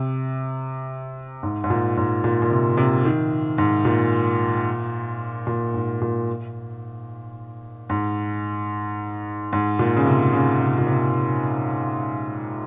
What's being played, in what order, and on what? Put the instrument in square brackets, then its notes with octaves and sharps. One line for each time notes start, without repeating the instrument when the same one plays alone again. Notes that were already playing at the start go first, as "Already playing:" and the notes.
Already playing: [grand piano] C3
G#2
G#2
A#2
G#2
A#2
A#2
C3
C3
D#3
G#2
A#2
A#2
G#2
A#2
G#2
G#2
A#2
C#3
C3
C#3
C3
A#2
C3